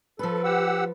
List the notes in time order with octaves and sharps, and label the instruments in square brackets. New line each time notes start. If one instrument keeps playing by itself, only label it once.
[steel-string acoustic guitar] F3 B4 [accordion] A4
[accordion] G4 F#5 E6